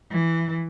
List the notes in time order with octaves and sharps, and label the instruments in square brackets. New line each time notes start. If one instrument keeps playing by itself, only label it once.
[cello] E3